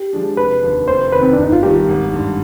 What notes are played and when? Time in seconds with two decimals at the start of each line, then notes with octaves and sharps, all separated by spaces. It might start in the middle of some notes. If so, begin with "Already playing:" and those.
Already playing: G4
0.13 F3 G#3 D4 G#4
0.37 F1 B4
0.63 D#2 D3 F3
0.88 F1 C5
1.12 F2 D#3 B4
1.22 C4
1.33 D4
1.38 G1 D#4
1.52 F4
1.63 G2 D#3 G4
1.89 G#1
2.13 G2 D3